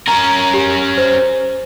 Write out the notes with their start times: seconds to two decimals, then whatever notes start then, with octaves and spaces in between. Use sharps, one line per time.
0.08 C#4 A#4 A#5
0.54 G4
0.97 C5